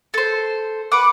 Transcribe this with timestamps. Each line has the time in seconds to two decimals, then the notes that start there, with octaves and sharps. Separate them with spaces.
0.14 A4 C5
0.92 B4 F#5 D6